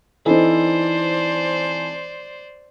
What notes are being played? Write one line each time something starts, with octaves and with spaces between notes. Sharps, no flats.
E3 C4 D#4 A4 C5 D5